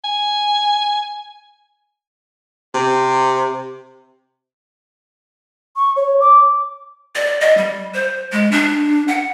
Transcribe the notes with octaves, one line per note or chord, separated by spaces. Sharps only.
G#5
C3
C#6
C#5
D6
D5
D#5
G3
C5
G#3
D4
F#5